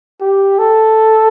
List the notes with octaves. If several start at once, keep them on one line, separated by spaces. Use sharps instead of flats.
G4
A4